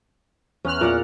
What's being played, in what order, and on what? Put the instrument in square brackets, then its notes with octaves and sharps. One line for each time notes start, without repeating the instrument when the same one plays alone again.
[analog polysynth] E2 F6 F#6 [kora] C#4
[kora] A#2 D5 F#5